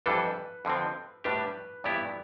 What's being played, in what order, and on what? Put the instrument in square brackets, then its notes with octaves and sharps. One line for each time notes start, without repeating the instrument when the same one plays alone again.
[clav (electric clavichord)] F2 E3 G3 D4 A4 [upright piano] B4
[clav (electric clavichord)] F2 D3 F3 C4
[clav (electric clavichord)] A2 G3 D4 G4 [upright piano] B4
[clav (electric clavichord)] G2 E3 B3 E4 G4 [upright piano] D5